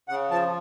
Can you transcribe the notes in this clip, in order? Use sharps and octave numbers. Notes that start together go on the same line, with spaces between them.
C#3 F#5
F3 A5